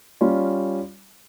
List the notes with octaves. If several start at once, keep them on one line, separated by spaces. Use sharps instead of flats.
G3 C#4 F4